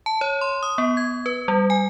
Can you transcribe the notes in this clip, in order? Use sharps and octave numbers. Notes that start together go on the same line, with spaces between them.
A5
C#5
C6
D#6
B3
G#6
B4
G3
G#5